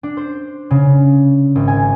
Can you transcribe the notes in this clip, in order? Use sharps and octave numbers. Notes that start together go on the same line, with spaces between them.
D4
C5
C#3
G#1
G#5